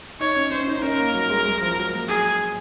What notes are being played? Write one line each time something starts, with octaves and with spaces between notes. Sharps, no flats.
D#4 C#5
C#4
C#4 C5
D#4
D#4
C#4 A#4
A#3
F#3
G#3
G#3
F3
F#3
A#3
G#4